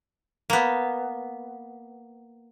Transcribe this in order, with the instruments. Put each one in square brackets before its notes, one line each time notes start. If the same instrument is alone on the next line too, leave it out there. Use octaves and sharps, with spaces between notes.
[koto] A#3 B3